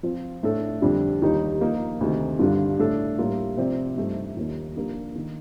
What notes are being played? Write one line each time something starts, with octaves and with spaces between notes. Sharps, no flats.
F3 C4 F4
A2 A3 D4 A4
F2 D3 G3 D4
D#2 D#3 G3 A#3 D#4
F3 A#3 D#4
D2 C3 D#3
G2 D3 G3 D4 F4
A2 A3 D4 A4
A2 G3 A#3 F4
C3 F3 C4 G4 D5
G2 F3 A3 D#4 G4
D#2 D#3 A#3
F3 A#3 D4 G4
D#3 A#3